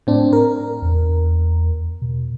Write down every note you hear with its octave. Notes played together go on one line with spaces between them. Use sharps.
A2 C4 D4
A#4
E2
B2